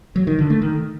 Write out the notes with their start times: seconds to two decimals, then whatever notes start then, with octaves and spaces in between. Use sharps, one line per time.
0.16 F#3
0.27 D#3
0.39 D3
0.50 A3
0.62 D#3